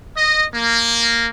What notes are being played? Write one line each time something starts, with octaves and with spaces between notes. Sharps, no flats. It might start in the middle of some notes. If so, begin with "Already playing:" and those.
D#5
A#3